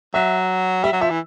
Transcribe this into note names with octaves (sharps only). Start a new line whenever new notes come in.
F#3 E5
G3 E5
F#3
F3 E5
E3